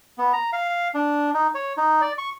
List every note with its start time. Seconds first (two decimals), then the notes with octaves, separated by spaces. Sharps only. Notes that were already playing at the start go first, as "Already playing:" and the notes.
0.18 B3
0.33 A#5
0.53 F5
0.95 D4
1.34 D#4
1.55 C#5
1.77 D#4
2.01 D5
2.18 C#6